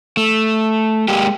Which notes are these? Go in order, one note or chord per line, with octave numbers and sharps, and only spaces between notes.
A3
G#3 A#3 G4